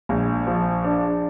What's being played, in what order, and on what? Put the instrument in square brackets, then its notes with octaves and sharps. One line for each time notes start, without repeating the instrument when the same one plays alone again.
[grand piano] A#1
F3
D4